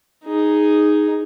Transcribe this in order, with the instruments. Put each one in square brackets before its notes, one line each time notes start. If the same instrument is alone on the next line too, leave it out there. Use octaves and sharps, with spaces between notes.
[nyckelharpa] D#4 G#4